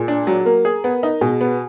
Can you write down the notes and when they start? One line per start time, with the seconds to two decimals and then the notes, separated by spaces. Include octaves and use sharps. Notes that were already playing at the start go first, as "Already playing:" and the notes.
Already playing: A#2 G#4
0.08 D4
0.27 F#3
0.46 A#3 A#4
0.65 G#4
0.84 B3
1.03 D#4
1.21 B2 G#4
1.41 B3